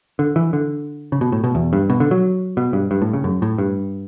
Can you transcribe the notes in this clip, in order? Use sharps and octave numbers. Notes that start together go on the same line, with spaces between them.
D3
E3
D3
C#3
B2
A2
B2
E2
G2
B2
D3
F#3
B2
G2
G2
A2
C#3
F#2
A2
G2